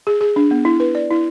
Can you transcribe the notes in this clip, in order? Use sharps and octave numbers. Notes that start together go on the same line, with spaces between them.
G#4
G#4
D4
B3
E4
B4
D5
E4